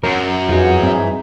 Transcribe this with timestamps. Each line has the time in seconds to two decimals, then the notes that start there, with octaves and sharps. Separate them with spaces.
0.03 F#2 A#4
0.49 F2 E3 D#4 F4 F#4 G#4
0.82 G2 C4 E5